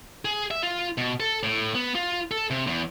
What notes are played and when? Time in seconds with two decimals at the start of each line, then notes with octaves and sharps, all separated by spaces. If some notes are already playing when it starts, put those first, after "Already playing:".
0.25 G#4
0.51 E5
0.63 F4
0.98 B2
1.20 A4
1.43 A2
1.75 B3
1.95 F4
2.31 A4
2.50 C3
2.67 E2